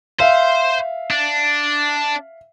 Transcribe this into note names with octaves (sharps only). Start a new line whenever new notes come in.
C5 E5 F5
D4